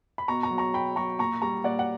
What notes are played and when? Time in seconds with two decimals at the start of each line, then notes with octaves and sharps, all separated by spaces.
0.18 B5
0.28 B2 A#5 C#6
0.43 A#5 C#6
0.51 F#3
0.58 A#5 C#6
0.74 B2 G5 B5
0.96 F#3 A#5 C#6
1.19 A#2 A#5 C#6
1.42 G3 A#5 C#6
1.64 A#2 D5 F#5
1.79 F#5